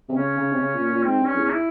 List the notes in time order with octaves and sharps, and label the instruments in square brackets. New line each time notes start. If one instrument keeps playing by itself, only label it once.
[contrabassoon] C3
[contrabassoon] C#3 [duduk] C#4
[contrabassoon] C#3
C3
C#3
A#2
A#2
[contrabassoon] G#2 [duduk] C4
[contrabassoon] G2
[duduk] C#4
[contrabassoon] E2
[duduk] C#4
E4